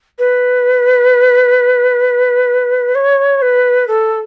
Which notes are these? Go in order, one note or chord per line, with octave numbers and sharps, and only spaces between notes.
B4
C#5
B4
A4